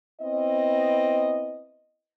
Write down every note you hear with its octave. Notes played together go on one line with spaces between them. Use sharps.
B3 C4 E4 D#5